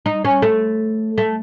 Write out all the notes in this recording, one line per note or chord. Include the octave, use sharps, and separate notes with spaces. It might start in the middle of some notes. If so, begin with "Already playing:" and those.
D#4
C#4
A3
A3